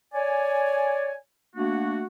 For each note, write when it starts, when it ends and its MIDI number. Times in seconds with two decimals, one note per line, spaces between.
0.14 1.14 73
0.14 1.14 74
0.14 1.14 80
1.56 2.05 57
1.56 2.05 58
1.56 2.05 62
1.56 2.05 66